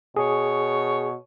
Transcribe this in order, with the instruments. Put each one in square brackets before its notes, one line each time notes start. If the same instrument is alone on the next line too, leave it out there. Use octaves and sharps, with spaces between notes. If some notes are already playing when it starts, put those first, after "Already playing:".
[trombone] B2 [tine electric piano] G#4 [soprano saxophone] C#5